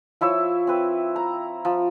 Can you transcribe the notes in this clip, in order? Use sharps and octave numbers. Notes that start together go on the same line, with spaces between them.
F3 E4 C#5 E5
C4 B4
A#5
F3